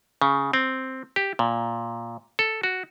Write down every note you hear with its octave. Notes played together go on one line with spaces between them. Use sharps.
C#3
C4
G4
A#2
A4
F#4